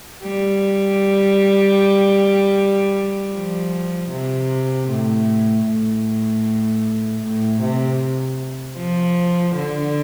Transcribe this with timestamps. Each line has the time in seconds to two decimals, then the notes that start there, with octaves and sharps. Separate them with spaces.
0.23 G3
3.33 F3
4.11 C3
4.89 A2
5.66 A2
7.22 A2
7.61 C3
8.77 F3
9.55 D3